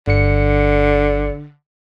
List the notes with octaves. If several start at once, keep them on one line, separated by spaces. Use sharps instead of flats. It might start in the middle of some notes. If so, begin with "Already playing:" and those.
G1 D3 C#7